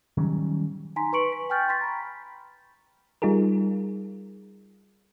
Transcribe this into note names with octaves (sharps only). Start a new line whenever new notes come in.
D#3 F#3 G3 C#4
D#4 G#5 A#5 C6 B6
B4 C6 C#6 C#7 D7 F#7
B6
G5 G#5 C#6 F6 G6 A6
C6 C#6 A6 B6
A#5 B5
G3 D#4 F4 G#4 A#4